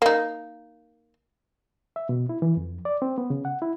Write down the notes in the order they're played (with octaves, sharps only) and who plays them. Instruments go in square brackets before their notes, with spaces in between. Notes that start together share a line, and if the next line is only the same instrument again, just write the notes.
[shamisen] A#3 D#4
[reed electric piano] E5
B2
E4
E3
F2
D5
C4
B3
C#3
F#5
E4